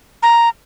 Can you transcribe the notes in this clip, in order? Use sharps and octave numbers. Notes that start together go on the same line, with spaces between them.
A#5